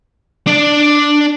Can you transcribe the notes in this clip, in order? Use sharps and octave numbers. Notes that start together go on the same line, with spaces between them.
D4 D5